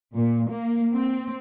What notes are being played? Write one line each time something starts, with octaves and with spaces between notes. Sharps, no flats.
A#2
A#3
C4